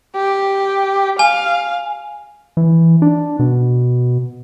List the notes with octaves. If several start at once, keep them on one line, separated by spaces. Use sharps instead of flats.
G4
F5 G#5
E3
D4
B2